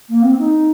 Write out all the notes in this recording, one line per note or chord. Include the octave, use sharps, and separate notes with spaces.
A#3
C4
D#4